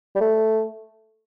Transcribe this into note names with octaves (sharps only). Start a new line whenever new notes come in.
G3
A3